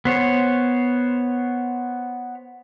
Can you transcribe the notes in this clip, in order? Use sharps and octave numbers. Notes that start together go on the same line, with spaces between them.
B3 C5 C#5